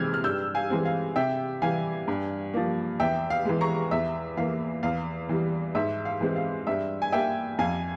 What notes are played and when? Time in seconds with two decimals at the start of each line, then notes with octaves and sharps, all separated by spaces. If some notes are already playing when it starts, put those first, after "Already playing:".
Already playing: C3 E3 G#3 C4 E6 F6 G6 G#6
0.14 F6
0.24 G2 E6 G6
0.55 F5 G#5
0.70 E3 G#3 C4
0.86 F5
1.16 C3 E5 G5
1.62 E3 G3 F5 G#5
2.08 G2
2.54 F3 A#3
3.00 E2 E5 G5
3.30 F5
3.45 E3 G#3
3.61 A#5 C#6
3.91 E2 E5
4.37 E3 A#3 F5
4.83 E2 F5
5.29 E3 G3
5.75 G#2 E5
6.05 F5
6.21 E3 G#3 C4
6.36 F5
6.67 G2 E5
7.02 G#5
7.12 G3 A#3 E5 G5
7.58 F2 F5 G#5